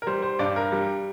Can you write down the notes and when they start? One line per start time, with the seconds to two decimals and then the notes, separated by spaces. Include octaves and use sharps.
0.02 A#4
0.07 G3 C5
0.22 C5
0.39 G2 D5
0.56 A#4
0.72 G3